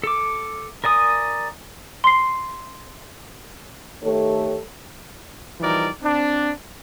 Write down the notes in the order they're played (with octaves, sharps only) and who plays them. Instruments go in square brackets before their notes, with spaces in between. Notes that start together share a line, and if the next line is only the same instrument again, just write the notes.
[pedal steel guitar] A4 D6
A#4 D5 G#5 D#6
[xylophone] C6 C7
[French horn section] D#3 A3 G4 A4 C#5
[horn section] E3 F3 G3 D#4 A#4 D5
C4 D4